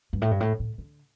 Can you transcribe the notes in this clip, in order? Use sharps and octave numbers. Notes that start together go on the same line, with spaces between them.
G2
A2
G2
A2
A2
D3